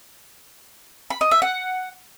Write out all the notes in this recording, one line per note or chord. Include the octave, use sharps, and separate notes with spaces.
B5
D#5
E5
F#5